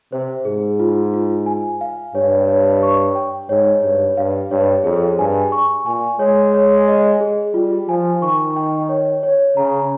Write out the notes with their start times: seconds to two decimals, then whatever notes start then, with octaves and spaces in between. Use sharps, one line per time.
0.12 C3 C5
0.45 G#2 G#4
0.80 F4
1.14 F4
1.46 G#5
1.81 F5
2.15 G2 C#5
2.48 C#5
2.83 C#6
3.15 G5
3.49 G#2 C#5
3.83 G2 C#5
4.17 G2 F5
4.51 G2 C#5
4.84 F2 G#4
5.18 G2 G#5
5.52 C#6
5.86 A#2 G#5
6.19 G#3 C#5
6.54 C#5
6.88 D#5
7.21 G#4
7.54 G3 F4
7.89 F3 G#5
8.22 D#3 C#6
8.56 G5
8.89 C#5
9.23 C#5
9.57 C#3 A#5